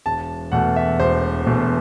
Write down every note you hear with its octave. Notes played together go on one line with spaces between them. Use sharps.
E1 A5
E2 B2 A3 F#5
E5
E1 C5
E2 B2 A3